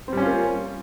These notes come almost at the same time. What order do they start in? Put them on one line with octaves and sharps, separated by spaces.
C4 G3 C#4 F4 A#3